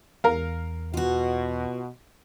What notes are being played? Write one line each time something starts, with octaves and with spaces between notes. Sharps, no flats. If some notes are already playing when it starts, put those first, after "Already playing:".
E2 A#4 F5
B2 F4 F#4